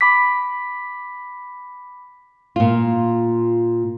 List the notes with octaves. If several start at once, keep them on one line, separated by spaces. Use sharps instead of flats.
B5 D6 B6
A#2 F4